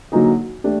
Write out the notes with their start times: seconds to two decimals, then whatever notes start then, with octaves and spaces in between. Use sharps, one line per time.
0.12 D3 F#3 A#3 D#4 G#4
0.64 A3 D4 G4